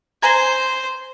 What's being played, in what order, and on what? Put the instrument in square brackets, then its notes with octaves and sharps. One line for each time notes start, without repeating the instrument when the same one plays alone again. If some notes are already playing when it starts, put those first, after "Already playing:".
[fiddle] C5 [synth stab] G#5 A#5 G#6